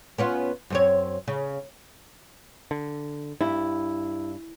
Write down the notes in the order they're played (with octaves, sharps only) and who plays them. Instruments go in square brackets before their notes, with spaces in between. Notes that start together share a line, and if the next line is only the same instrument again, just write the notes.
[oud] B3 C#4 F4
F#2 C4 C#5
C#3
[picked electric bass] D3
[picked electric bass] G2 [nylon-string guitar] E4